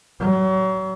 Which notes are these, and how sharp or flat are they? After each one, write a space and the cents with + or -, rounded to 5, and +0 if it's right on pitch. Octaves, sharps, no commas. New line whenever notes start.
F#3 +35